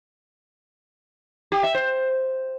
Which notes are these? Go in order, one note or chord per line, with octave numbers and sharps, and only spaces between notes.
G4
E5
C5